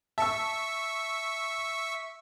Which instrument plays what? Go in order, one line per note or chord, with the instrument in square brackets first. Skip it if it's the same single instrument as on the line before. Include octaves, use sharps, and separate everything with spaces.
[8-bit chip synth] E5 C#6 [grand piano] A5 E6